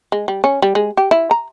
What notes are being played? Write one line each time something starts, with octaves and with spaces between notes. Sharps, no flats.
G#3
G3
C#4
G3
G#3
G4
E4
A#5